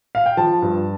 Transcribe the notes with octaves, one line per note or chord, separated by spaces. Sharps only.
F5
G5
F3 A5
G2